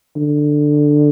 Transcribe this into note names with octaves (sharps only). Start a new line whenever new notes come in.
D3